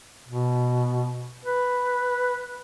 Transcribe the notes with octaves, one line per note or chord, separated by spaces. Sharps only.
B2
B4